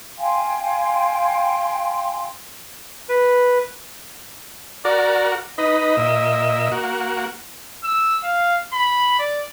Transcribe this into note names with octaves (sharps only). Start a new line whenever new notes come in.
F5 G5 G#5 C6
B4
F#4 A#4 D5
D#4 B4 D#5
A#2 E5
A#3 F#4
E6
F5
B5
D5